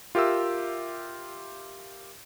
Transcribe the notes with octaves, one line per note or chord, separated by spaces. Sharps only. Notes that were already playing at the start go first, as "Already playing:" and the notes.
F4 G4 A#4 E5 E6